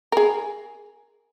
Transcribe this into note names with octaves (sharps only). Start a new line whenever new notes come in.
G#4 A#4